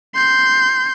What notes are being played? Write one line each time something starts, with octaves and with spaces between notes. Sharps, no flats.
C6 G6